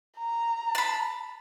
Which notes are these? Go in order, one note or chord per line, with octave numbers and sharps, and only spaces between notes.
A#5
A5 B5